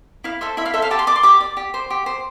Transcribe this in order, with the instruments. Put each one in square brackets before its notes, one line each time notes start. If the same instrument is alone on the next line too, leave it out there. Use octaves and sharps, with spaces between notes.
[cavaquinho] E4 F5
A4 C5 E5
E4 E5
F5
A4 C5 E5
F5
G4 A5
C6
D5 D6
C6
G4 D6
D5
G4
C5
G4
C5